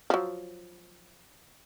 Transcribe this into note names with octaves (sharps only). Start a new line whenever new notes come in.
F3 F#3